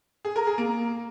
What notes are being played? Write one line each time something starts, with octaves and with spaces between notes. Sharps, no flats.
G#4
A#4
G#4
A#3